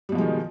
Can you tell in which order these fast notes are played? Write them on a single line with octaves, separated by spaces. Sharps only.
G3 B2 F3 G#3 D#3